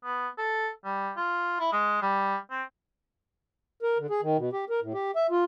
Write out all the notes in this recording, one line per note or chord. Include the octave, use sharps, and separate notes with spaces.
B3
A4
G3
F4
E4
G#3
G3
C4
A#4
D3
G#4
D#3
B2
G4
A#4
A2
G4
E5
F4